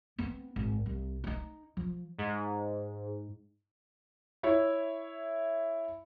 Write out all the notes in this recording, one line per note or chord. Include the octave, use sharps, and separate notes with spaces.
B3 C4
G#1
C2
D#4 E4
F3
G#2
E4 C#5 E5